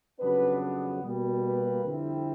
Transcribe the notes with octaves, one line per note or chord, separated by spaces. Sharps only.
F2 C#3 F#3 B3 D4 B4
B2 G3 A#3
B4
F2 D3 G3 C4 E4